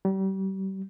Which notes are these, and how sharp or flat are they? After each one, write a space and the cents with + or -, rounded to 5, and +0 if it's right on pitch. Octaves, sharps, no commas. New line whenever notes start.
G3 -35